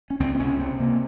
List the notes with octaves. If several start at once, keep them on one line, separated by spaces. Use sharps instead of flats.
C#4
C#2 C4
C4
C3 C#4
C3 C4
C3 A#3